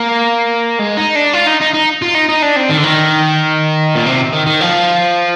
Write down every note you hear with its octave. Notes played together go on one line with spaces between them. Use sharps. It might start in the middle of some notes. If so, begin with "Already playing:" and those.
Already playing: A#3
G#3
D#4
D4
F4
D#4
D#4
D#4
F4
D#4
D#4
D4
C4
D#3
D3
D#3
A#2
C3
D#3
D#3
F3